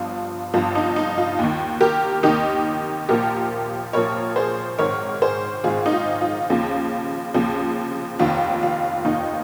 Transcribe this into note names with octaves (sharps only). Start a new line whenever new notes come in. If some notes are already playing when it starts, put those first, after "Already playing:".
Already playing: G1 G2 F3 F4
G1 G2 F3 F4
D#4
D#4
F4
D#2
D#3
G4 A#4
D#2 D#3 D#4 G4
A#1 A#2 F3 G4 A#4
A#1 A#2 F3 A#4 C#5
G#4 C5
G#1 G#2 D#3 A#4 C#5
G#4 C5
G#1 G#2 D#3 F4 G#4
D#4
F4
F4
D#2 C#3 F3
D#2 C#3 F3
F1 D#2 D#3 F4
F4
F1 D#2 D#3 D#4